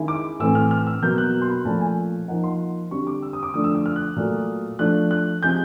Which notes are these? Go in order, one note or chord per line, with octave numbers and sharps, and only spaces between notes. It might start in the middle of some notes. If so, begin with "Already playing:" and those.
Already playing: D#3 G#3 C#4 E4
D6
A2 E3 A3 C4 E6
F6
F6
E6
B2 F#3 A#3 G6
F#6
C6
B5
A#2 F3 A3 C#4 A5
G#5
F3 A#3 D#4 F#5
C6
D3 G3 C4 C#6
D6
E6
D#6
D6
D3 F3 A3 D4 D#6
E6
E6
F6
F#6
A#2 F#3 A3
F3 A3 D4 F#6
F#6
C3 F3 G#3 C#4 G6